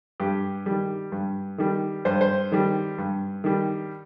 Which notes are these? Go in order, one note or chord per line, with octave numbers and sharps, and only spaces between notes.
G2 G4
D#3 G3
G2
D#3 G3
G2 C5
C5
D#3 G3
G2
D#3 G3